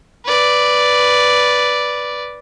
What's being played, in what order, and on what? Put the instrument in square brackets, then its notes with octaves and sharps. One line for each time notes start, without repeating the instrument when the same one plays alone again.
[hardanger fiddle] B4 D5